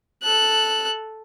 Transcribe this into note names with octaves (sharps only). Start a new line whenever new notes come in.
A4 F#6